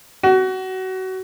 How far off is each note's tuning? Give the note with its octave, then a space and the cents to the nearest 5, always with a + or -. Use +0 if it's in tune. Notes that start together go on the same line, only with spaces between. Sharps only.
F#4 +25